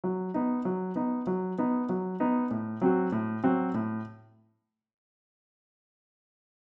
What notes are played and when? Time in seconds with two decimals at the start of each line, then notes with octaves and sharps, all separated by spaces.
0.04 F#3
0.34 B3 D#4
0.65 F#3
0.96 B3 D#4
1.27 F#3
1.58 B3 D#4
1.89 F#3
2.20 B3 D#4
2.51 A2
2.81 F#3 C4 F#4
3.12 A2
3.44 F#3 C4 F#4
3.74 A2